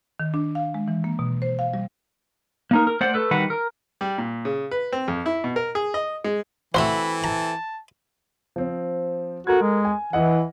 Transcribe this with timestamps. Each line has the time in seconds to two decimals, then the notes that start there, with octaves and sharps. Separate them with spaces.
0.20 D#3
0.34 D4
0.55 F5
0.74 G#3
0.88 E3
1.04 A#3
1.19 B2
1.42 C5
1.59 F5
1.74 G3
2.71 A#3 D#4 A#4
2.87 A#4
3.01 A3 C5 D5 F#5
3.14 A3 A4 B4
3.31 D#3 G3 F#4 B4 F#5
3.50 A#4
4.01 G3
4.18 A#2
4.45 C#3
4.71 B4
4.92 C4
5.08 F2
5.26 E4
5.44 B2
5.56 A#4
5.75 G#4
5.94 D#5
6.24 G#3
6.74 E3 A3 C4 F#4 C5 B5 C6
7.24 A5 A#5
8.56 F3 C4
9.47 F#4 A4 A#4 G#6
9.62 G#3
9.85 G#5
10.13 E3 E4 D#5 F#5